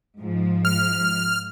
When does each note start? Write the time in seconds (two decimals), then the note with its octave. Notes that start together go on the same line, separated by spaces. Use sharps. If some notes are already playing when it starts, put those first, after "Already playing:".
0.17 G#2 F3
0.65 F6